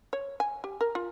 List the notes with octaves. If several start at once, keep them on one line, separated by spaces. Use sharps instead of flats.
C#5
G#5
G4
A#4
F4